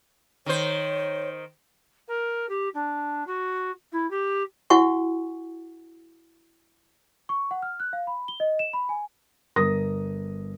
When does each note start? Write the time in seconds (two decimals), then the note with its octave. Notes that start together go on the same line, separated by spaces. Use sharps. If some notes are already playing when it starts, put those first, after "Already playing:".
0.46 D#3 C5 C#5
2.07 A#4
2.49 G4
2.74 D4
3.26 F#4
3.92 E4
4.10 G4
4.70 E4 F#4 F#5 G#5 C#6
7.29 C#6
7.51 F#5
7.62 F6
7.80 F#6
7.93 F5
8.07 B5
8.28 G7
8.40 D#5
8.59 E7
8.73 B5
8.89 G#5
9.56 G1 A#4 D#6 A#6